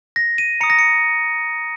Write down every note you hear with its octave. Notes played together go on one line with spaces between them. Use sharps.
A#6
D#7
A#5 D#6 C#7
A#6
C#7